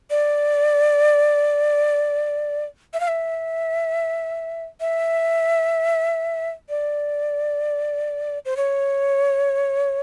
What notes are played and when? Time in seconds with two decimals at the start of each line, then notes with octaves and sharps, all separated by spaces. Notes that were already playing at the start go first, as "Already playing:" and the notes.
0.10 D5
2.93 E5
3.00 F5
3.08 E5
4.80 E5
6.69 D5
8.45 C5
8.57 C#5